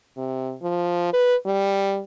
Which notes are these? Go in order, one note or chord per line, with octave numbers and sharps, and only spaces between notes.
C3
F3
B4
G3